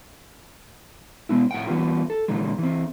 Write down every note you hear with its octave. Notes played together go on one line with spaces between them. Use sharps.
B2 G#3 B3 E4
A2 F#5 G5
E3 G3 B3 F4
A4
A#2 D3 E3 G#3
E3 C4